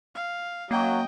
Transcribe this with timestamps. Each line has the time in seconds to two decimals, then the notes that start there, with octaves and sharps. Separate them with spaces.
0.15 F5
0.71 F#2 F#3 A#3 D#5 G5